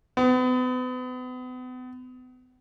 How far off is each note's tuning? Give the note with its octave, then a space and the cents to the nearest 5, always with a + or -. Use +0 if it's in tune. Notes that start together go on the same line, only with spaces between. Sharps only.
B3 +40